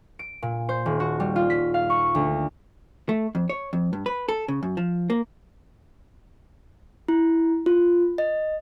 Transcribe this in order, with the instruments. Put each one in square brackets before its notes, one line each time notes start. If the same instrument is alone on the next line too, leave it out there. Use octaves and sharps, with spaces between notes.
[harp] D7
A#2
C5
D#1
F#4
G3
F4
B6
F5
C#6
D2
[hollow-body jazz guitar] A3
F2
C#5
F2
G2
B4
A4
C#3
F#2
F3
A#3
[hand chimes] E4
F4
D#5